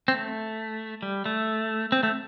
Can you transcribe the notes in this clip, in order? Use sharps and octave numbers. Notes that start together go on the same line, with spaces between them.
C4
A3
G3
A3
C4
A3